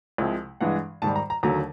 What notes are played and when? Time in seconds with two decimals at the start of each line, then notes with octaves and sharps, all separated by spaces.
0.18 C2 C3 F3 G#3
0.61 G2 E3 G#3 F#5
1.02 G#2 D#3 G3 A5
1.16 A#5
1.30 A#5
1.43 D#2 D3 F#3 A3 A#5